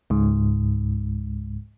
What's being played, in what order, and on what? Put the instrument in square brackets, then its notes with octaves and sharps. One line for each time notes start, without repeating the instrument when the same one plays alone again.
[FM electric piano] C#2 G#2